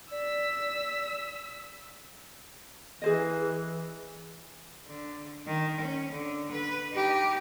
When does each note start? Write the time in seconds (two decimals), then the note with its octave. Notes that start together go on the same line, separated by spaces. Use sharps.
0.11 D5 E6 B6
3.02 E3 G#4 C5 D#5
4.86 D3
5.47 D#3
5.80 C#4
6.11 D3
6.51 B4
6.92 D#4 G4